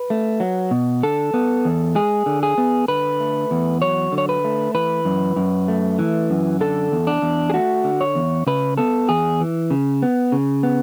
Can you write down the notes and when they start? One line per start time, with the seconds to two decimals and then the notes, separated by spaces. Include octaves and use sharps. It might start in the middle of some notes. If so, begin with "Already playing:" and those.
Already playing: B4
0.10 A3
0.40 F#3
0.71 B2
1.03 D3 A4
1.34 B3
1.65 E2
1.95 G#3 G#4
2.26 D3
2.43 G#4
2.58 B3
2.88 D3 B4
3.20 A3
3.51 E2
3.82 F#3 C#5
4.12 D3
4.18 C#5
4.29 B4
4.44 A3
4.75 E3 B4
5.05 F#2
5.36 F#2
5.68 A3
5.99 E3
6.30 F#2
6.61 D3 A4
6.92 E2
7.07 D4
7.22 E2
7.50 G#4
7.54 A3 F#4
7.84 D3
8.01 C#5
8.15 E2
8.47 C#3 B4
8.78 B3 A4
9.09 E2 G#4
9.41 E3
9.71 C#3
10.02 B3
10.32 C#3
10.63 B3